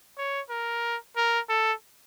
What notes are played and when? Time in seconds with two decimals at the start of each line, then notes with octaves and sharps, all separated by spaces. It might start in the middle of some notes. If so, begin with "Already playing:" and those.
0.18 C#5
0.50 A#4
1.16 A#4
1.49 A4